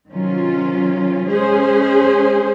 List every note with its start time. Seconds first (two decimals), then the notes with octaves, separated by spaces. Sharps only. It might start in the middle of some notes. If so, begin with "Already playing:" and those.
0.13 C3 D#3 F#3 C#4 F4
1.29 G#3 C#4 G#4 C5